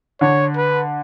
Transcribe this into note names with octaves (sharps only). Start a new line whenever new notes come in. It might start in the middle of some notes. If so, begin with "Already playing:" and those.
D3 C#5
B4